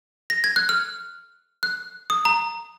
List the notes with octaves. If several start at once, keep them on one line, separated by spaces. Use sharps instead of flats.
A#6
G#6
F#6
F6
F#6
D#6
A#5